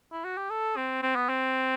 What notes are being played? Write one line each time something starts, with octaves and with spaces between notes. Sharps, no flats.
E4
F#4
G4
A4
C4
C4
B3
C4